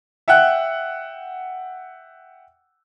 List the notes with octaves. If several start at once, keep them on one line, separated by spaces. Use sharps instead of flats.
E5 F#5 G5 F#6